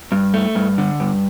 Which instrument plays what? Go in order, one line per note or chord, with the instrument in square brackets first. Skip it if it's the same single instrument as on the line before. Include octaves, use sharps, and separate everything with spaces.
[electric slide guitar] G2
A3
G2
D3
G2